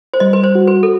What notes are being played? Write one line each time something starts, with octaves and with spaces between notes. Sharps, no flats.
C5
G3 D#5
B4
C5
F#4
B4
A4